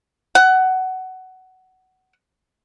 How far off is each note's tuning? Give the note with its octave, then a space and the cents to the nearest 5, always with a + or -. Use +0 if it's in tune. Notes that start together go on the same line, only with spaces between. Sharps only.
F#5 +15